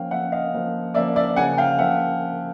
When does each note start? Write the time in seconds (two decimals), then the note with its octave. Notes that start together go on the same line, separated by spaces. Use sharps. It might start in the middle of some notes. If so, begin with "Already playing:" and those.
Already playing: F3 A#3 C#4 F5 G5
0.11 F3 A#3 C#4 E5 F#5
0.32 D#5 F5
0.53 F3 A#3 C#4
0.94 F3 A#3 C#4 D5 E5
1.16 D5 E5
1.36 C#3 F3 A#3 F#5 G#5
1.57 F5 G5
1.78 C#3 F3 A#3 E5 F#5